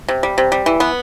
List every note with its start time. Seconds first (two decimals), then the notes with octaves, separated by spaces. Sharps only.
0.08 C3
0.23 G3
0.38 C3
0.52 G3
0.66 E3
0.80 B3